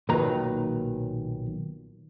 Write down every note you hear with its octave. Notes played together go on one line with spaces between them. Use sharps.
B1 A#2 D#3 F#3 B4 A#5